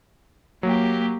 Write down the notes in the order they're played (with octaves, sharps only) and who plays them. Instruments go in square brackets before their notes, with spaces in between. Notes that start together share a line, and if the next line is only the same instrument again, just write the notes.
[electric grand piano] F#3 [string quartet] A#3 G4